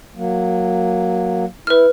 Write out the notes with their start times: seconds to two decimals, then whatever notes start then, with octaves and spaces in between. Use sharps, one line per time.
0.16 F#3 A#3
1.67 E4 B4 F6